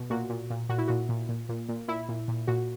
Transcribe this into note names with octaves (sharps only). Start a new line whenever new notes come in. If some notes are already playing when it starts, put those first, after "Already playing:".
Already playing: B2
A#2 F#4
A#2
A#2
A#2 F#4
E4
A#2 F#4
A#2
A#2
A#2
A#2
A#2 E4
A#2
A#2
A#2 F#4